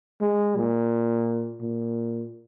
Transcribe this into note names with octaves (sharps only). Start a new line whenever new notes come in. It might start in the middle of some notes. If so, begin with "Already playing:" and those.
G#3
A#2
A#2